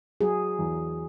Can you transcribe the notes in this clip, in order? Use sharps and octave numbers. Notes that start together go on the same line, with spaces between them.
F#3 G#4
E2